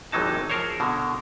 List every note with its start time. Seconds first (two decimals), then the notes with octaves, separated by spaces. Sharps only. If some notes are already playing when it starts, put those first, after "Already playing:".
0.12 G#1 C3 E3 F#3 D#4 A5
0.50 F3 G#4 A#4 C5 C#5
0.80 B2 D3